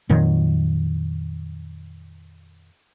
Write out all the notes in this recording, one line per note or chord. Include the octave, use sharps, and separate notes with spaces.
F2 A#2 D#3 F#3